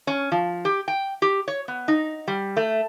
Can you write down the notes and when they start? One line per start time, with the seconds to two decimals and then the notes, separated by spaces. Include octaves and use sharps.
0.07 C#4
0.32 F3
0.65 G4
0.88 G5
1.22 G4
1.48 C#5
1.68 B3
1.88 D#4
2.28 G3
2.57 A3